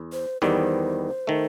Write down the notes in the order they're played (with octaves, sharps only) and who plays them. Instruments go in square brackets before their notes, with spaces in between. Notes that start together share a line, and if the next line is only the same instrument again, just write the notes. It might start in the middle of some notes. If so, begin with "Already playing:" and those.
Already playing: [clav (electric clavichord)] E2
[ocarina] C5
[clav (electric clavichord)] E2 D#3 G3 B3 [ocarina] C5
[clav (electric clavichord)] D#3 A3